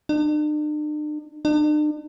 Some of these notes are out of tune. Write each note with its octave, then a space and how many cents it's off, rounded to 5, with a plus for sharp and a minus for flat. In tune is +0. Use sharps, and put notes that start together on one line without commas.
D4 +45
D4 +45